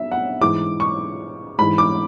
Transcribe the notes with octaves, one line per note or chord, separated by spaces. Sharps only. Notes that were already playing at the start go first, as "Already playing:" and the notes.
Already playing: B2 E5
F#5
G#2 E3 D6
C#6
G#2 E3 B5
D6